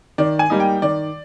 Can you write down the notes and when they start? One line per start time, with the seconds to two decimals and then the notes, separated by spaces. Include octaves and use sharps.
0.18 D#3 D5
0.39 G#5
0.50 G3 A#3 D#4
0.60 G5
0.82 D#3 D5